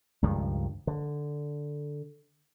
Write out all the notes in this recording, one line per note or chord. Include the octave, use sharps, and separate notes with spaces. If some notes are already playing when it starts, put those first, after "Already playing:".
C#2 G2 D#3 F3
D3